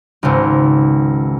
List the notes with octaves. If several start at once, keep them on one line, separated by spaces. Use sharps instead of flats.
G#1 C#2